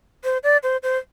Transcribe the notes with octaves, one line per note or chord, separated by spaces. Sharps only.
C5
D5
C5
C5